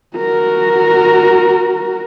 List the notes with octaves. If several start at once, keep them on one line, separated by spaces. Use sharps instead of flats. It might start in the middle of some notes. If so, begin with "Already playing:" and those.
F#4 A#4